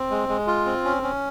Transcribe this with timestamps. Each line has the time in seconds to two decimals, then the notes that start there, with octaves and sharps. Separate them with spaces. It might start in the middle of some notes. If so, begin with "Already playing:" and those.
Already playing: C4
0.11 G#3
0.29 G#3
0.47 F4
0.66 C4
0.85 C#4
1.03 C#4